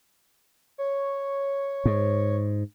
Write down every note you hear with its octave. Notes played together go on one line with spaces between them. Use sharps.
C#5
G#2